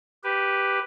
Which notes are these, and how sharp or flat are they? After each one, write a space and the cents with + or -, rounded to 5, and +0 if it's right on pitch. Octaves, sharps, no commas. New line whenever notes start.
G4 +0 B4 +0